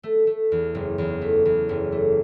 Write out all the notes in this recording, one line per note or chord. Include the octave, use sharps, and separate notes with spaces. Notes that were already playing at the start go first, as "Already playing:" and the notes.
A3
A3
E2
F#1
E2
A3
E2
F#1
A3